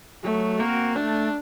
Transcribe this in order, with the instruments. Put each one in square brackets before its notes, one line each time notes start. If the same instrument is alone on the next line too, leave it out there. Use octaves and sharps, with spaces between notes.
[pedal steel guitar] F#3 [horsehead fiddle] A3
[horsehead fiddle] A#3 [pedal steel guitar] C4 F#4 A#4
[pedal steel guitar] A3 [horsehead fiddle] D4